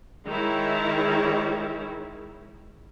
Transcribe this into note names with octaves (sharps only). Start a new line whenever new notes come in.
D#3 G#3 E4 C#5